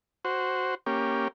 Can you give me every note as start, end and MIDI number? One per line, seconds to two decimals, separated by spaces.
0.25 0.75 66
0.25 0.75 72
0.86 1.28 58
0.86 1.28 61
0.86 1.28 67